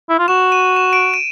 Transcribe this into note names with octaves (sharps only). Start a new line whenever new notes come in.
E4
F4
F#4 E7
D#7
E7
D7
D#7